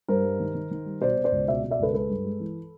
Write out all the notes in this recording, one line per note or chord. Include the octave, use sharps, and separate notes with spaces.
G2 A#4 C5
G3
D#3
D#3
D#3
G3
B2 C5 D5
B2
C5 D5
C#2
B2 D5 E5
B2
D5 E5
C#2 A4 B4
G#3 A4 B4
G2
G#3
E3